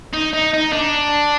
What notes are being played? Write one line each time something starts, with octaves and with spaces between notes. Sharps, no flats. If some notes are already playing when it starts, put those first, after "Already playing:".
D#4
D#4
D#4
D4